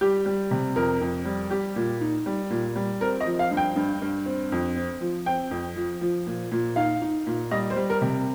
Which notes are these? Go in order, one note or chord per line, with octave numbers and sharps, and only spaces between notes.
G3 G4
G3
C3
F2 A#4
F2
G3
G3 G4
A#2
D#4
G3
A#2
G3
C4 A#4
D#5
F3
F5
G2
G5
G2
G2
C4
F2
C4
F3
C4 G5
F2
F3
F3
A#2
A#2
D#4 F5
D#4
A#2
G3 D#5
C5
G3
A#4
C3